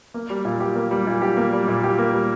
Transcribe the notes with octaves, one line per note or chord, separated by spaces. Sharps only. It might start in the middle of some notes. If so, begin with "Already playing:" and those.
A#3
G3
A#2
G4
A#3
G3
A#2
G4
A#3
G3
A#2
G4
A#3
G3